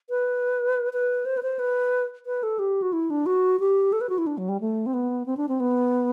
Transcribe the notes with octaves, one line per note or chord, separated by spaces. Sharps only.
B4
B4
C5
B4
C5
B4
B4
A4
G4
F#4
E4
D4
F#4
G4
A4
B4
F#4
E4
D4
F#3
G3
A3
C4
B3
C4
D4
C4
B3